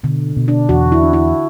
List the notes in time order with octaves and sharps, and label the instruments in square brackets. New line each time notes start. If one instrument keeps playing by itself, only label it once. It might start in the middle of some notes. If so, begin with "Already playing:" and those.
[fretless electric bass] B2 [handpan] D3
[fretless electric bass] B2
[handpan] D4
[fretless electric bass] E2 [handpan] F#4
[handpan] E4
[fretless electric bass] D4
[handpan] E4